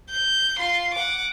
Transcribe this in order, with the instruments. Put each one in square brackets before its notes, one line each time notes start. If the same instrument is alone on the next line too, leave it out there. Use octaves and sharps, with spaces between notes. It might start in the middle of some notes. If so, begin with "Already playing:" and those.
[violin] G6
F4 C6
F#5 D6